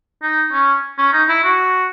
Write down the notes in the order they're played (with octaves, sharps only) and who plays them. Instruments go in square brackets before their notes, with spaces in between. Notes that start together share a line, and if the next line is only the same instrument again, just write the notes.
[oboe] D#4
C#4
C#4
D#4
E4
F#4